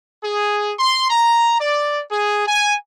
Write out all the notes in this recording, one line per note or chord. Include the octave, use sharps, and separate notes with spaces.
G#4
C6
A#5
D5
G#4
G#5